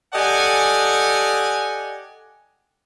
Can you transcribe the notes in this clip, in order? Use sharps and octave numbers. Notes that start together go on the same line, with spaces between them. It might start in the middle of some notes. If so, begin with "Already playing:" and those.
G4 A4 D5 D#5 F#5 G#5